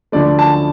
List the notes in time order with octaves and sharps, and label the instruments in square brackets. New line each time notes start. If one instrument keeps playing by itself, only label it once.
[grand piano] D2 D3 F3 A3 D5
A5